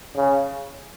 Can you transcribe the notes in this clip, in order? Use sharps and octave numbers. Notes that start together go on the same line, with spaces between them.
C#3